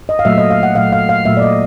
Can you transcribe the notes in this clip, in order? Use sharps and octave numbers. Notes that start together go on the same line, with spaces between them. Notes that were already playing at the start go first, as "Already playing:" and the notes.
D#5
F5
A#2 F#3 A3 E5
D#5
F5
F#5
A#2 F#3 A3 F5
F5
F5
A#2 F#3 A3 E5
D5
D#5